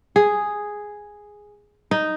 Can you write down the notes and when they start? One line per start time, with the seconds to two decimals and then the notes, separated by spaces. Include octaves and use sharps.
0.16 G#4
1.91 D#4